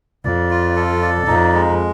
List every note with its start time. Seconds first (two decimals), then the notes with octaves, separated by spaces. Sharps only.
0.25 F2 D5
0.51 F4
0.76 A4
1.02 D5
1.27 F2 D#4
1.54 G#3